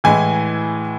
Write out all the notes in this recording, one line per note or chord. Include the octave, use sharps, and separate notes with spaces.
A2 E3 G#3 G#5